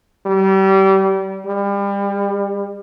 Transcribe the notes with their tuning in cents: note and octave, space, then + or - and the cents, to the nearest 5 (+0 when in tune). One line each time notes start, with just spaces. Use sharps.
G3 -30
G3 +30